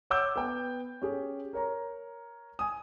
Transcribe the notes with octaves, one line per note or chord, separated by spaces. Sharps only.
C#5 F#5 D6 E6 G6
B3 G5
C#4 G4 G#4
A#4 C#5 A#5
G#5 D#6